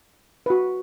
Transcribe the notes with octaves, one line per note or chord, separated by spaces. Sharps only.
F#4 B4